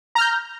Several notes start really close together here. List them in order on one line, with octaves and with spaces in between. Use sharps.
A#5 F6 G6